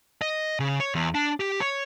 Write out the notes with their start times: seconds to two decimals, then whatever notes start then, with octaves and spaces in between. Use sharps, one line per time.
0.22 D#5
0.60 C#3
0.80 C#5
0.95 E2
1.15 D4
1.40 G4
1.61 C#5